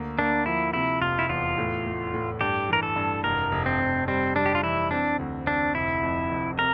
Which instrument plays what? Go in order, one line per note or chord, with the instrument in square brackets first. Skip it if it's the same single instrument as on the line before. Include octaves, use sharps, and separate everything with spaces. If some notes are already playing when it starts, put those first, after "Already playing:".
Already playing: [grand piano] D2 A#3
[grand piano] A#3 [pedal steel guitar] D4
[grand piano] F3 [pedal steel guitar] E4
[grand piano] C3 [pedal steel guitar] E4
[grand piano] F1 [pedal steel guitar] F4
[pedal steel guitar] E4
[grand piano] E2 [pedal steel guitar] F4
[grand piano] A2
A3
A2
[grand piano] G2 [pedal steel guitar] G4
[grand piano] E3 [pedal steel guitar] A#4
[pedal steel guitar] A4
[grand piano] G2
[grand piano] F1 [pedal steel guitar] A#4
[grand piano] F1
[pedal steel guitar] C4
[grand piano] F1
[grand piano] G3 [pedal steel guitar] C4
[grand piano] G3 [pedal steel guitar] D4
[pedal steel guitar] G4
F4
[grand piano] E3 [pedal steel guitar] E4
[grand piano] C4 [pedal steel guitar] D4
[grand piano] D2
[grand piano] C4 [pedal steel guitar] D4
[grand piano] F1 [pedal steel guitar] E4
[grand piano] F2
F1
[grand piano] C3 [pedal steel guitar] A#4